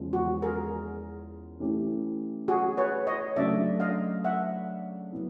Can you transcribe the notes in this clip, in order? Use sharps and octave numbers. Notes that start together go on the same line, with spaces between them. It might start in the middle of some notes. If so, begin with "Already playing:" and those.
Already playing: E2 C#3 F3 G#3
F#4
G#4 A#4
E3 A3 C#4 E4 G4
F#4 G#4
B4 C#5
C#5 D#5
C#3 F#3 A3 D4 F#4 D5 E5
D#5 F5
E5 F#5
F#3 B3 E4